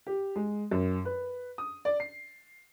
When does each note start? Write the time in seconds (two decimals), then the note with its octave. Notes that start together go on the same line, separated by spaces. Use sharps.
0.07 G4
0.36 G#3
0.71 F#2
1.05 B4
1.58 D#6
1.85 D5
2.00 C7